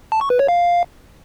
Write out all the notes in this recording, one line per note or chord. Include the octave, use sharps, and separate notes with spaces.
A5
C#6
B4
C#5
F5